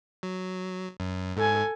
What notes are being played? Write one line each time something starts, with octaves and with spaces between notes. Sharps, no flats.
F#3
F#2
G#2 A4 G#5